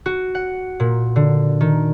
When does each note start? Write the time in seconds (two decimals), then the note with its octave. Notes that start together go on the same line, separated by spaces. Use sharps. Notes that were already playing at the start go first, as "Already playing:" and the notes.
0.06 F#4
0.35 F#5
0.80 A#2
1.16 D3
1.61 D#3